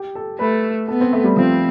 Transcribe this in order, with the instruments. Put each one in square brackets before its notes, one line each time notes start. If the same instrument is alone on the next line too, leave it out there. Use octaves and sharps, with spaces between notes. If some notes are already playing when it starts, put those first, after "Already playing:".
Already playing: [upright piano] G4
A4
[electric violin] A3 [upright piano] B4
[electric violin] B3 [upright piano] A4
[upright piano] C4
A3
G3
[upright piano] F3 [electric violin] C4